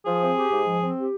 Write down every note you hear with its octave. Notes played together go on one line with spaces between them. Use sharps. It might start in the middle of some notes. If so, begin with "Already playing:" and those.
F3 G#4
C4
G4
G#2
F3
C4
G4